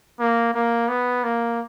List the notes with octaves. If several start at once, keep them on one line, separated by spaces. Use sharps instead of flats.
A#3
A#3
B3
A#3